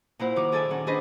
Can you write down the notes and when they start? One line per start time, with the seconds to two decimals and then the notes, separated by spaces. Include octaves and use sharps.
0.19 A#2 E4 C5 F#5
0.36 D#3 F#4 D6
0.52 G#4 A4 D5 E5 G#5
0.70 D#3 C#4 F#5
0.87 C#4 D4 G#4 B4 C5 D#5